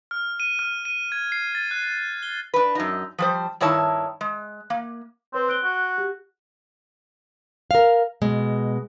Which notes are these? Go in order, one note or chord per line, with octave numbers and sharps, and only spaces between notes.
F6
D#7
F6
D#7
G#6
C7
A6
F#6
G7
D4 B4
F#2 D#4
F3 G3 C5
G2 D#3 E4 C#5 A5
G#3
A#3
C4 B4 C#5 C6
F#6 D7 G7
F#4
G4
A#4 F5
B2 G#3